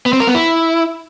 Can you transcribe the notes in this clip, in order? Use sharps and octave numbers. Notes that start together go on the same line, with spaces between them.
B3
C4
A#4
B3
E4